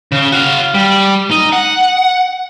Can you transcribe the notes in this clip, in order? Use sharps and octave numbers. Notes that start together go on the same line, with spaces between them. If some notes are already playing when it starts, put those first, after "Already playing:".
C#3
F#4 F5
G3
D#4
F#5